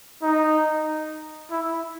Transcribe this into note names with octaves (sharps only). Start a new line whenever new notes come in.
D#4
E4